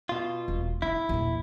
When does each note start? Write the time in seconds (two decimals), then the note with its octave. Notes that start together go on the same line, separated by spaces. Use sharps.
0.09 B2 F4
0.48 E1
0.82 D#4 E4
1.09 A#1 E2